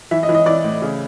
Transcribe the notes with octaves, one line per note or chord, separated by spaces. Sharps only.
E3 E5
D#5
E3
D#5
E3 D5
A2
C#3